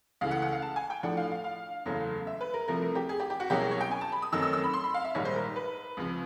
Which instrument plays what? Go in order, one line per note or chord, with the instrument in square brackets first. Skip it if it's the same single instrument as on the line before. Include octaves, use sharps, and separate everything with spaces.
[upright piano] C#2 C#3 E3 A3 F5
F#5
F#5
F5
A5
G#5
G5
A2 F3 A3 D4 F#5
F5
F5
F5
F#1 E2 C#3 F#3 A3
E5
B4
A#4
C2 C3 F3 A3 A#4
A#4
G4
G#4
G4
G4
F#4
C2 B2 F#3 A#3 C#4 G4
G#4
C#5
G5
G#5
A5
B5
D#6
F#2 D#3 F#3 A3 C4 E6
E6
E6
B5
C6
B5
F5
E5
A#1 G#2 D#3 G3 C#5
C5
A#4
B4
C#2 C3 F3